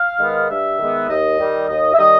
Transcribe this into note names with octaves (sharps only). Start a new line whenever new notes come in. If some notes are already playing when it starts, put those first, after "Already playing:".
Already playing: F5
D#3 G#3 B3
G2 E5
D#3 G#3 B3
D#2 D#5
D#3 G3
D#2 D#5
E5
D#3 G3 D#5